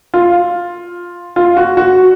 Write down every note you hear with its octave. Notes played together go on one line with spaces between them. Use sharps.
F4
F4
F#4
F#4